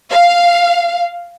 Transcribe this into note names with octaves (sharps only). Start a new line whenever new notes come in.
F5